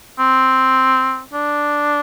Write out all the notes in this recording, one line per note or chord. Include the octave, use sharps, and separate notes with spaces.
C4
D4